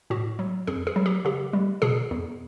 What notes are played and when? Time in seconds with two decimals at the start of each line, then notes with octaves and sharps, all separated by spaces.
0.10 A2 F#4
0.39 F#3
0.67 F2 G#4
0.87 G#4
0.96 F#3
1.06 G4
1.25 C#3 G4
1.53 G3
1.82 B2 G#4
2.11 E2